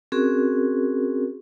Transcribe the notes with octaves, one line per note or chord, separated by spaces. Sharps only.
C4 C#4 F#4 G#4 A#4